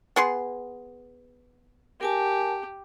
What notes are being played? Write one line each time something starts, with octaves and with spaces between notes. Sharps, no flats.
B3 G#4 C6
G4 A#4 G#5 A5